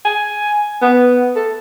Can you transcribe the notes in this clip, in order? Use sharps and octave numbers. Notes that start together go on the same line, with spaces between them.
G#5
B3
A4